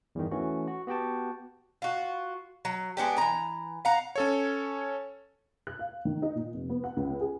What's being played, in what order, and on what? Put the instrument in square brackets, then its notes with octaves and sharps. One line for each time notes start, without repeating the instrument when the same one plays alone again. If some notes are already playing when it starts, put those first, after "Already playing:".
[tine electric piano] E2 G2 D#3
E3 A3 C#4 F#4
F#4
B3 F#4 G4 G5 A5
[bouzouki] F4 F#4
F#3
G#3 B3 D4 G4
E3 A#5
F5 F#5 A#5
[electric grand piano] C#4 A4 C#5
[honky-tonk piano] F#6
F5
D#3
D#4
A#2
F1
B3
F#5
C#2
G#4